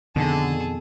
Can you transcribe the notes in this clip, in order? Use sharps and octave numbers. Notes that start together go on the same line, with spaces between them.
F2 B2 D3 D#3 G#4 A4